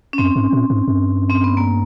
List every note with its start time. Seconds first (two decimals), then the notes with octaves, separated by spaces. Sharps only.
0.13 C#4
0.18 F#2 C4
0.36 G#2
0.53 A#2
0.70 G#2
0.88 G2
1.30 C4
1.44 B3
1.57 A#3